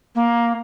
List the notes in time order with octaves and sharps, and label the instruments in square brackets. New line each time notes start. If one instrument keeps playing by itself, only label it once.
[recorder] A#3